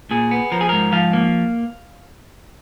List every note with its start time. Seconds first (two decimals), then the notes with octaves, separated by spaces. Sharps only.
0.11 A#2 G#4
0.31 B3
0.52 F3 A#4
0.61 G#4
0.69 G#2 A#4
0.92 F3 F5
1.13 A#3